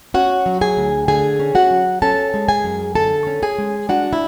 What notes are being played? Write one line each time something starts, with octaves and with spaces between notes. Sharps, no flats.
C#4 F#4 F#5
F#3
G#4 G#5
D2
D3 G#4 G#5
C#4
F#4 F#5
F#3
C#4 A4 A5
G#3
G#4 G#5
F#2
D3 A4 A5
C#4
G#4 G#5
G#3
D4 F#4 F#5
E4